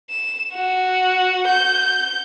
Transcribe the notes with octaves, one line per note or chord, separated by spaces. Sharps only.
E7
F#4
G6